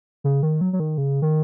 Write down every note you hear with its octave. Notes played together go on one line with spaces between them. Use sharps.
C#3
D#3
F#3
F#3
D#3
C#3
D#3